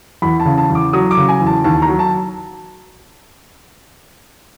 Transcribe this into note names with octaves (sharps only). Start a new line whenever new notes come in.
E2 B5
A5
C#3
A5
E2
D6
F#3 D#6
D6
C#3
G#5
E2
A5
D#2 A5
A#5
F#3
A5